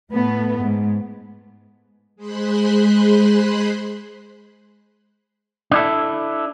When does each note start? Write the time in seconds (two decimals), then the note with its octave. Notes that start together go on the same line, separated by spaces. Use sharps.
0.12 A2 A3 B3
0.62 G#2
2.16 G#3 G#4 C5 B5 C6 F#6
5.71 D4 E4 A4